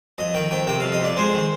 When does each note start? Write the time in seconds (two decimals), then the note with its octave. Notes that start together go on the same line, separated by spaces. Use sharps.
0.18 F2 D#5
0.34 D#3 G5
0.51 F2 G5
0.67 C3 G5
0.80 F2 F5
0.92 D#5
1.00 F2 D5
1.17 G#3 C5
1.33 D#3